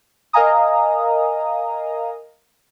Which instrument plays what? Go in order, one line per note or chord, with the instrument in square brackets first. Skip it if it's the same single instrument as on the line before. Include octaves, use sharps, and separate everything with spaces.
[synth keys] A#4 D#5 F5 G#5 A#5 D#6